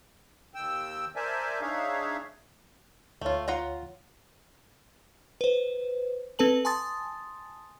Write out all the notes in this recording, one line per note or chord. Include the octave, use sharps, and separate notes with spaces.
D#2 G5 E6
A#4 C5 D5 E5 G#5 A5
D4 D#4 G#4 C#5 E5 F5
D2 A3 F4 C#5
F4 F#5 A#5
B4 C5
C4 A4 B4 A5 F#7
G#5 A5 C6 D#6 A6